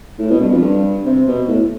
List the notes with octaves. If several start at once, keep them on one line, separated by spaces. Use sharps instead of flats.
A2
B2
G2
F2
G2
C3
B2
A2